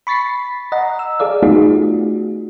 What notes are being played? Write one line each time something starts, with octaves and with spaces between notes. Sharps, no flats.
B5 C#6 A6 B6 C7
D#5 F#5 A#5
E6
G#4 A4 D5 F5
A3 B3 D#4 F4 F#4 G#4